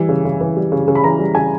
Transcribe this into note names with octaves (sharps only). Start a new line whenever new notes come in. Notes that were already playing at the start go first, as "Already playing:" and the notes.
Already playing: E3 G3
C#3
C#3
E3
G3
C#3
C#3
B5
E3 A#5
G3
C#3 G#5